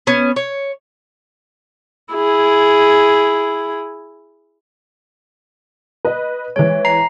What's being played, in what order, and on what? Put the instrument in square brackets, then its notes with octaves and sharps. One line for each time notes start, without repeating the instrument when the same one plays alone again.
[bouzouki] B3 C#4
C#5
[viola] E4 G#4
[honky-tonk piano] B4 D#5
[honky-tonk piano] E3 G#3 [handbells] C#5
[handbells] A#5 C7